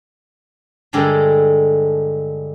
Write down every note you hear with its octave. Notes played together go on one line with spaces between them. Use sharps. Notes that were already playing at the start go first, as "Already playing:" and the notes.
G2 D3 G#3 G4 A4 A#4